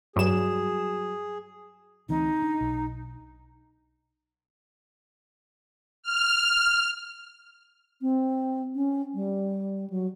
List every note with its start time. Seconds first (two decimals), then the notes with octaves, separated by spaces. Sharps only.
0.16 G2 F#3 G#4 E7
2.09 D2 E3 C4 D#4
2.42 D4
2.61 B1
6.03 F6
8.02 C4
8.75 C#4
9.14 G3
9.90 F#3